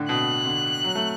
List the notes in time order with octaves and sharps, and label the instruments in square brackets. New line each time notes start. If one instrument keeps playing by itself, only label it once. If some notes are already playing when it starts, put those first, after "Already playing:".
Already playing: [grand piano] A2 D3
[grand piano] B2 [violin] F#6
[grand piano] D3
F#3
A3